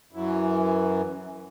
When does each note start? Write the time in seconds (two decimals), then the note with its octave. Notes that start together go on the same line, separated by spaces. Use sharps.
0.12 F#2 E3